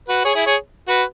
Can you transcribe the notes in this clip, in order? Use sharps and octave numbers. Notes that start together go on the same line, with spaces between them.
F#4 B4
G#4 C#5
E4 G#4
G#4 C#5
F#4 B4